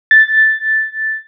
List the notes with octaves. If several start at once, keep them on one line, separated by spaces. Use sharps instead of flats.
A6